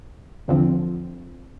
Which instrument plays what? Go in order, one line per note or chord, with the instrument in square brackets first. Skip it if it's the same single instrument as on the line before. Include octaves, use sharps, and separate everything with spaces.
[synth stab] E2 D3 F3 C4